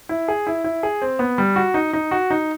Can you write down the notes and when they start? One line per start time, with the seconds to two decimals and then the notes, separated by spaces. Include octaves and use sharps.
0.09 E4
0.28 G#4
0.47 E4
0.64 E4
0.83 G#4
1.02 C4
1.19 B3
1.38 G3
1.56 F#4
1.74 D#4
1.93 D#4
2.11 F#4
2.30 D#4